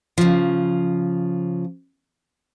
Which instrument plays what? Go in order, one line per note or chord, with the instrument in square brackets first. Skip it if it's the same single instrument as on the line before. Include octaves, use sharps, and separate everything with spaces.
[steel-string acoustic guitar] C#3 F3